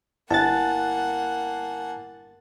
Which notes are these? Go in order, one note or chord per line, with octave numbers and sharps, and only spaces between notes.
G1 A#3 E4 F#5 G#5 A5 F#6 A6